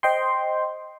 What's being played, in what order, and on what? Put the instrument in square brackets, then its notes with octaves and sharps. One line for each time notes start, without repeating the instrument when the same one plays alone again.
[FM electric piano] C5 D#5 G5 C6